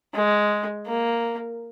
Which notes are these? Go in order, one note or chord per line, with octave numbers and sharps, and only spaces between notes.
G#3
A#3